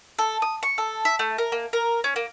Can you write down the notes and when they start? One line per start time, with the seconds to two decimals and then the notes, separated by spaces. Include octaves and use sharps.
0.19 A4
0.42 D#6
0.63 C#6
0.78 A4
1.05 E5
1.19 A3
1.38 A#4
1.52 A#3
1.73 A#4
2.04 C#4
2.16 A#3